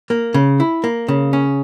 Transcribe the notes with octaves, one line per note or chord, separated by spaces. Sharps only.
A#3
C#3
E4
A#3
C#3
C#4